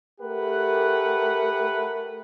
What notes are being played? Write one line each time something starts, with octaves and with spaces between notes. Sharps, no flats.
A3 G4 A#4 B4 F#5